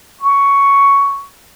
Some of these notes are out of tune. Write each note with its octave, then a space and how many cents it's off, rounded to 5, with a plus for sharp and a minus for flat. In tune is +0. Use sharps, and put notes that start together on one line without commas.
C#6 +10